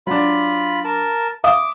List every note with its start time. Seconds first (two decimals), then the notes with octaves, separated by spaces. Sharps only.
0.07 F#3 D4 F4 B5
0.85 A#4 A5
1.44 E5 D6 D#6